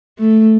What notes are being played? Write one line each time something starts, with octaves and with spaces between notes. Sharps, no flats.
A3